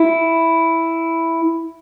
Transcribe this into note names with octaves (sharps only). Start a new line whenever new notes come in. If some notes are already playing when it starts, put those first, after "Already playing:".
Already playing: E4